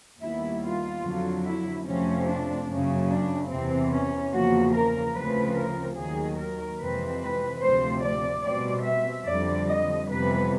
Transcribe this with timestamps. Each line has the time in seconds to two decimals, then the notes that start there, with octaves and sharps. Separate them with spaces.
0.21 D#2 D#3 G3 B3 E4
0.62 F4
1.03 F2 D3 F#3
1.45 E4
1.85 F2 C3 F3 A3 C4 C#4
2.27 D4
2.68 F#2 C#3 F#3 A#3
3.09 D4
3.50 E2 C3 E3 C4
3.91 C#4
4.32 E2 C#3 F3 A#3 F#4
4.74 A#4
5.15 D2 C#3 F3 A3 C4 B4
5.56 A#4
5.97 D#2 D#3 F#3 G#4
6.38 A#4
6.79 F2 C3 E3 G#3 C4 B4
7.21 B4
7.61 D2 C3 F3 A3 C4 C5
8.03 D5
8.44 B2 G3 C4 D5
8.85 E5
9.26 F2 D3 G3 D5
9.68 D#5
10.08 F2 C3 E3 G3 B3 B4